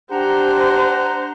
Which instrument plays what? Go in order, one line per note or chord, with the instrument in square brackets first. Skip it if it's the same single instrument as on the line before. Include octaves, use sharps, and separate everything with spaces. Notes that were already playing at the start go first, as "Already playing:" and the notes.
[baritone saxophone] D4 [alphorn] G4 [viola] C5 [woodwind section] F#5 A#5